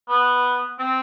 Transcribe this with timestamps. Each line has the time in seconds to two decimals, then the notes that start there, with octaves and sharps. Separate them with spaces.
0.09 B3
0.79 C4